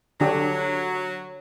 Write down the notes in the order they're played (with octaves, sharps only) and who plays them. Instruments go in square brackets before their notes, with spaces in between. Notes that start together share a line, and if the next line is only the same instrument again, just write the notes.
[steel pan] D3 D4 G4 [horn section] F#3